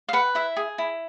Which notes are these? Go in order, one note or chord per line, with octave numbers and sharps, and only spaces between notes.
F5
B4 F#5
E4 E5
G#4
E4